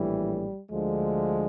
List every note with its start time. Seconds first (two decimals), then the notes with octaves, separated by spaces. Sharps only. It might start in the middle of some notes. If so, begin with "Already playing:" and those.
Already playing: A#1 A2 E3 G3
0.70 D2 D3 F3 G#3